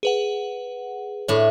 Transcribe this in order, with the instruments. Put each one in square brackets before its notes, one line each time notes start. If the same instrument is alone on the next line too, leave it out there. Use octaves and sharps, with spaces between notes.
[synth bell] G#4 B4 F#5
[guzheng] A2 D4 [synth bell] C#5